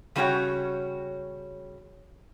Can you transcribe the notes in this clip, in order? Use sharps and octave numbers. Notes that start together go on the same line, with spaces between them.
C#3 G3 C#4 F#4 C#5 G5